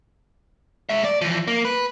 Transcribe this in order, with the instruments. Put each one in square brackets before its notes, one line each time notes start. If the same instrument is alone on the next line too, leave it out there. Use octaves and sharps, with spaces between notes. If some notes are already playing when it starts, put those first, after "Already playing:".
[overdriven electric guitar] G#3 E5
D5
E3 F3
A#3
B4